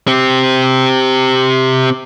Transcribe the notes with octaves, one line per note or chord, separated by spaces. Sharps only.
C4 G4